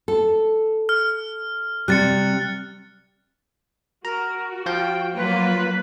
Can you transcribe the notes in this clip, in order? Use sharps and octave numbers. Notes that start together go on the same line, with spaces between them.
A4
F6
C3 G3 F#6 A6 C#7
F#4 A#4 A#5
F3 F5 G5 G6
F#3 A#3 F4 B4